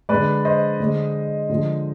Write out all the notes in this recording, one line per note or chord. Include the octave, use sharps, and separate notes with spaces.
G#3 B4 D5
D3
C5 D#5
D3 G#3
D3 F3 G#3